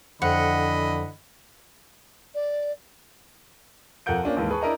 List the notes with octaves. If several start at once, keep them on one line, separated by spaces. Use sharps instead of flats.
F2 D3 E3 D#5 F#5 B5
D5
F2 A4 A#4 F#5 G6 D7
A#3 C#4 D4 F4
D#2 G#2 E3 A#3 A5
G#4 B4 A5 C#6
D4 E4 A#4 D#5 A#5